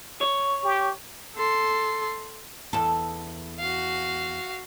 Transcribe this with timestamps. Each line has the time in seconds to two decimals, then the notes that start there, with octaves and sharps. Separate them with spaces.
0.21 C#5
0.64 G4
1.36 A4 C6
2.73 E2 A4
3.59 F#4 F5